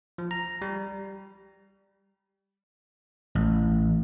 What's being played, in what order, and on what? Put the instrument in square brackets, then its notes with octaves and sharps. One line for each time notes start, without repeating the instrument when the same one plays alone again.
[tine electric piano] F3
A#5
G3
[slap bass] A1